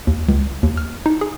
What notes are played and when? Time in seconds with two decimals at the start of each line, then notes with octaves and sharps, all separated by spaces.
0.07 D#2
0.29 C#2
0.63 D#2
0.77 F6
1.06 D#4
1.21 G#4